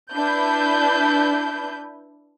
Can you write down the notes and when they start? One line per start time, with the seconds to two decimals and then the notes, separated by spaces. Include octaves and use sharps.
0.14 D4 E4 B4 G6